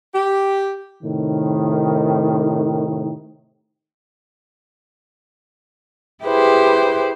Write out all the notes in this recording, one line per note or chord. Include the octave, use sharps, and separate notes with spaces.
G4
A2 C3 D#3
E4 G4 G#4 B4 C5